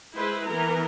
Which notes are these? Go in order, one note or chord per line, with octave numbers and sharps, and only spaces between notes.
G#3 E4 B4 C5
E3 B3 A#4 A#5